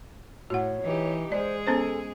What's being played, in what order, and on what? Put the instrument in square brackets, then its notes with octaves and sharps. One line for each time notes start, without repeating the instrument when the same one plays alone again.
[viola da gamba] A2 [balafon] F#4 F#5 [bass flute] C#5
[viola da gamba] E3 D#4 G4
[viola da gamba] G#3 G#4 [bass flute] C5 [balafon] D5
[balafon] B3 C#4 C5 [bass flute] A4